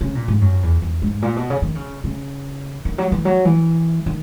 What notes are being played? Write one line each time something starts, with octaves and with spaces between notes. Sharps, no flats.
C#3
A#2
G#2
F#2
E2
E2
G#2
A#2
B2
C#3
D#3
C#3
C#3
D#3
F#3
E3
F#3
E3
D#3